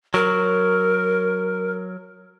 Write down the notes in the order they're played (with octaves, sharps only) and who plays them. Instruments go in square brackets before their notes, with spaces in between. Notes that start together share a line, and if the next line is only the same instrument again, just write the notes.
[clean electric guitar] F#3 [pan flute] A#4